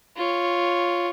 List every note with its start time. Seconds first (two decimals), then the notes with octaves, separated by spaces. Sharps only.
0.17 F4 C#5